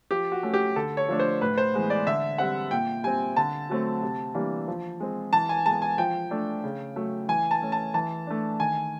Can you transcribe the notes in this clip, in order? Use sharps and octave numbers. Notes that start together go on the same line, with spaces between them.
F3 G4
F#4
A3 C#4
G4
D3 A4
C#5
F3 A3 D4
C5
A2 B4
C5
E3 G#3 B3
D5
D3 E5
G3 C4 F#5
A#2 G5
G3 C4 G#5
D3 A5
F#3 A3 C4
C3
E3 G3 A#3 D4
F3
G#3 C4
E3 A5
G#5
G#3 B3 A5
G#5
F3 G5
A3 D4
C#3
F#3 A3
E3 G#5
A5
A3 C#4
A5
E3 A5
A3 D4
D#3 G#5